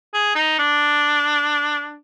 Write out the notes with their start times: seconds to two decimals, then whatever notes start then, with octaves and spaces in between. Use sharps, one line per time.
0.14 G#4
0.35 D#4
0.59 D4